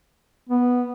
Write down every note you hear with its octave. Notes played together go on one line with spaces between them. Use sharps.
B3